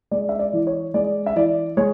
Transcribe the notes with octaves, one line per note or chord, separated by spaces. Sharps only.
G#3 D5
E5
D5
E3
C#5
G#3 D5
E5
E3 D5
G#3 C#5